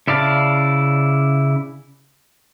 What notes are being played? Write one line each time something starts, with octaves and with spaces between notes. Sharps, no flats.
C#3 E4 D5 F5 A5